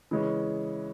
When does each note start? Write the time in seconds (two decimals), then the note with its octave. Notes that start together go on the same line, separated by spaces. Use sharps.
0.11 C#3 E3 G#3 C#4